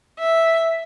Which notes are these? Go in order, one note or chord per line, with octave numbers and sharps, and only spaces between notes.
E5